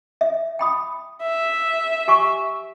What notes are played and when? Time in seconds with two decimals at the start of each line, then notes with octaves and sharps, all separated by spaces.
0.21 E5
0.59 G5 B5 D#6
1.23 E5
2.08 G4 G#5 C#6